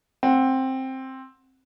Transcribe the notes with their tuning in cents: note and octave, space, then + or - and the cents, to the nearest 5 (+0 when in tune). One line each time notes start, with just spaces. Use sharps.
C4 +10 F#5 +0